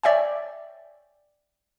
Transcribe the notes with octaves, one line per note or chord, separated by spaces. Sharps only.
C#5 D5 E5 G5 G#5